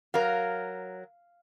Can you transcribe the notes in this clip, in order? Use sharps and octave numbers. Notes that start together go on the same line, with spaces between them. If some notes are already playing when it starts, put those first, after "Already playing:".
F#3 A#4 F5